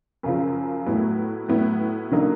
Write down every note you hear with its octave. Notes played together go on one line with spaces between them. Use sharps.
F#2 C#3 F3
A2 F#3 B3 E4
A2 F#3 B3 E4
D3 F#3 A#3 D#4